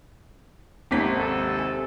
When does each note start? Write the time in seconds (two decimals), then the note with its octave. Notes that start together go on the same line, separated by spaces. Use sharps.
0.91 G#1 D#2 C3 B6
1.17 A4
1.59 G#5